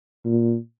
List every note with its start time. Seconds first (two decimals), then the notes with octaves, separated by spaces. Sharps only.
0.25 A#2